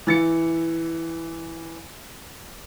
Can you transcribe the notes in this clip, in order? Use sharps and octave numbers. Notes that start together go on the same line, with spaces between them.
E3 A6 C#7